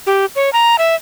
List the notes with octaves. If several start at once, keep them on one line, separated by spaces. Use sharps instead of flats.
G4
C#5
A#5
E5